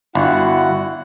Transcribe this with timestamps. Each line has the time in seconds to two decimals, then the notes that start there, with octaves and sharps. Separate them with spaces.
0.15 G1 E4 F#4 F#5